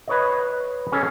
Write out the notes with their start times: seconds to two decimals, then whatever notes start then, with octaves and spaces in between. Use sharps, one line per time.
0.07 B4 C#5 D#5
0.92 C#4 G#4 A4